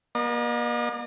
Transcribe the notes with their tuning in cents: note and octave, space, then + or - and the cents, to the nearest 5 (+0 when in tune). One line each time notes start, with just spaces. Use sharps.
A#3 +40 D#5 -40